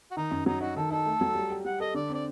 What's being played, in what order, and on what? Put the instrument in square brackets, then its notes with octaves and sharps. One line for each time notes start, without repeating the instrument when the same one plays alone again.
[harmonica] F#4
[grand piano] D#3 [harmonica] D#4
[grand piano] F#2
[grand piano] F#3 [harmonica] D#4
[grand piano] D#4 [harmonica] F#4
[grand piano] D#3 [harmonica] A4
[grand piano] D#4 [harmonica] A4
[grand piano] A3
F#3
G3
G4
[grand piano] G3 [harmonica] F#5
[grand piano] A4 [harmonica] D#5
[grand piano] D3 [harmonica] D5
[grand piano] C4 [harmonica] D5